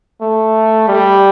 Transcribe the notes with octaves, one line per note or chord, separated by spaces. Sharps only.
A3
G3